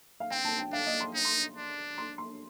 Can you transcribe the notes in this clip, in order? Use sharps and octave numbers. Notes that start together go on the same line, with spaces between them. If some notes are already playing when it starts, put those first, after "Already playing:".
F5
C4 G5
A5
G5
D4 F5
D#5
C6
D#4
C6
D4
C6
C6